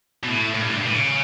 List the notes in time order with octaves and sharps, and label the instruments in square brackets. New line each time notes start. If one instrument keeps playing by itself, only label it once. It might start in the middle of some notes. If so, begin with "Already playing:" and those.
[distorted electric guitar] B2
A2
A2
G2
A2
G2
A2
C#3